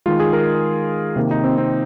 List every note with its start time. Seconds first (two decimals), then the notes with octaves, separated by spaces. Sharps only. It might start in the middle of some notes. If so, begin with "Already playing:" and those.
0.06 D#3 G#3 F4
0.20 G#4
0.33 A#4
1.16 C3 D#3 A#3
1.31 D#4
1.44 C4
1.58 C4